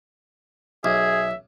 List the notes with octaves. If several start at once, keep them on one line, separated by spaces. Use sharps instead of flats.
B1 G#4 E5